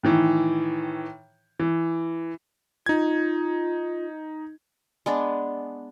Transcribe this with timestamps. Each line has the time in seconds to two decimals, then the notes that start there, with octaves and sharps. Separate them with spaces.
0.03 A2 D#3 E3
1.59 E3
2.86 D#4 F4 G#6
5.06 G#3 B3 D4